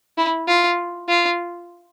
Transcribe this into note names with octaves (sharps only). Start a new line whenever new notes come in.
E4
F4
F4